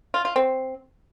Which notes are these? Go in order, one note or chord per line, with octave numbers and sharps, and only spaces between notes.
F4
F4
C4